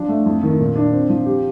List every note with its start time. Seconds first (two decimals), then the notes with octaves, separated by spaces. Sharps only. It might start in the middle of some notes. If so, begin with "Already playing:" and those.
Already playing: F3 D4
0.08 A3
0.26 F2
0.43 D#3
0.59 A#2
0.75 D4
0.92 C4
1.09 F3
1.26 G4